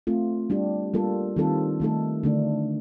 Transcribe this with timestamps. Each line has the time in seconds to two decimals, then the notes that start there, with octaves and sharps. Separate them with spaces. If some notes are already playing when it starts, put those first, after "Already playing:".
0.07 A3 C4 F4
0.50 G3 D4 G4
0.94 G3 A#3 F4 A4
1.37 D#3 G3 C4 F4 A4
1.80 D#3 A3 D#4 A4
2.23 D3 A3 D4